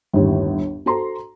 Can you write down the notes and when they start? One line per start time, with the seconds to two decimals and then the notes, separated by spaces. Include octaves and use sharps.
0.13 G1 D#2 A2
0.86 F#4 A4 C5 A#5 C6